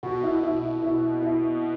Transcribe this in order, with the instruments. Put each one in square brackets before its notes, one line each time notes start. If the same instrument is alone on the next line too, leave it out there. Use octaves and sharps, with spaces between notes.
[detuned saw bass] B2 [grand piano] F#4
[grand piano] E4
E4
E4
E4